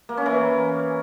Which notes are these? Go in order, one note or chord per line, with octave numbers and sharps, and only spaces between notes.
A#3
C#4
E3